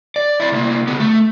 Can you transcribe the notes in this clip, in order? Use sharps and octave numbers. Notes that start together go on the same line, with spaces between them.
D5
E4 D5
C2 A#3
C#3 B3
A3